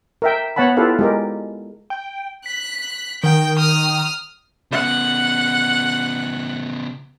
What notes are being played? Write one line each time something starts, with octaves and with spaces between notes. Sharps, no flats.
A#4 E5 G5
B3 C#5 F#5 A5 B5
E4 F4 G4 A4 B4 F5
G#3 G4 A#4
G5
F#6 B6
D#3 G5
D#6 F6
C#3 B3 F#5